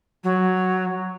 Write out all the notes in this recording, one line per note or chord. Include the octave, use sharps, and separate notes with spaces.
F#3